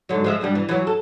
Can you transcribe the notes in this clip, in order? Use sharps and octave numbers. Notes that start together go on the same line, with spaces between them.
G#2 D3 F#3
F3 G#3 E5
G2 B2 G3
E3
E3 F#3
A4